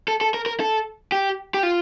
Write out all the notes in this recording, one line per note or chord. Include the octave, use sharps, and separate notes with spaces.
A4
A4
A#4
A#4
A4
G4
G4
F4